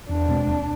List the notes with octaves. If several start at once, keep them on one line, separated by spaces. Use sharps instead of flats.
E2 D4
B2 G#3 C4
D#2